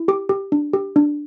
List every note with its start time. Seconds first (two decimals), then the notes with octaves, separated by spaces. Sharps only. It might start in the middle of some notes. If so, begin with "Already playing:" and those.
Already playing: E4
0.08 G4 D6
0.29 G4
0.52 D4
0.73 G4
0.96 D4